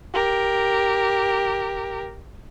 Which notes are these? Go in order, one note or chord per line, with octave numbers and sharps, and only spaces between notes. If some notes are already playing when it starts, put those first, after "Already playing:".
G4 A#4